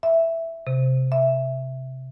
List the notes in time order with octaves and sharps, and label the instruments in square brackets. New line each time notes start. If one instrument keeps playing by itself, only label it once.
[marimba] E5
C3
E5